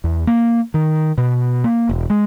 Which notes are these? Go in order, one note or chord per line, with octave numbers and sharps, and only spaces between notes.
E2
A#3
D#3
B2
A#3
E1
G#3